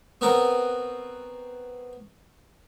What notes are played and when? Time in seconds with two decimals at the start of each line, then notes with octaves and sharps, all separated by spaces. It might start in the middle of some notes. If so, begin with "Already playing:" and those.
0.21 B3 C4 F#4 A#4 B4